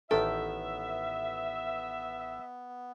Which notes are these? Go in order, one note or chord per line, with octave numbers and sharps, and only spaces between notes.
A1 D#3 B3 A4 E5 G5